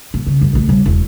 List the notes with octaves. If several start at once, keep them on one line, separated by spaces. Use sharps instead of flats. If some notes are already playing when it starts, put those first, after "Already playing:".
A#2
C#3
F#2
A#1 A2
B1 G3
E1 E4